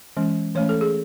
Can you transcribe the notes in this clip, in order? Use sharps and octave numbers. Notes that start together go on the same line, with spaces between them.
E3 G#3 C#4
E3 A3 C#4 C#5
A4
G#4